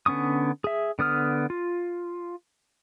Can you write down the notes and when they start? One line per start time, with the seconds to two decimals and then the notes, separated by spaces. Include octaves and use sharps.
0.06 D3 B3 C#4 C#6 D#6
0.64 G#4 E5
0.99 D3 B3 D#6 F6
1.50 F4